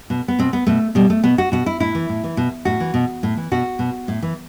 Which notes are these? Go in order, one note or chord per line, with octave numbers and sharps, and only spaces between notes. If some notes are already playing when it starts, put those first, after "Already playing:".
B2
B3
B2 C4
B3
B2 A3
B2 G3
A3
B2 B3
F#4
B2 F#4
E4
A2 E4
E3
A2
E3
B2
A2 F#4
E3
B2
A2
E3
B2 F#4
B2
A2
E3